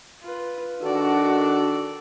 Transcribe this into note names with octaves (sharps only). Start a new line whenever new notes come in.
F4 B4
D#3 D4 F#4 A4 D5